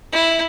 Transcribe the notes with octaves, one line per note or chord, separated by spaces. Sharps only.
E4